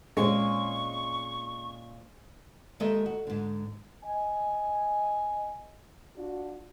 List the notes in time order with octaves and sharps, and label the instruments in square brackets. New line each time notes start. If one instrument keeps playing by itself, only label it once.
[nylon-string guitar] A#2 C4 C#4 [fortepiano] G#3 [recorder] C#6
[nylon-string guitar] D#2 D#3 G#3 A4 D#5 E5
F#4
G#2 D3
[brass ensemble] D#5 G#5
D4 F4 F#4